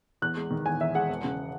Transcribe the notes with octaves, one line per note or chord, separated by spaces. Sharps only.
E2 F#6
G#3
D#3
E2 G#5
E2 E5
G#3 F#5
E1
C#3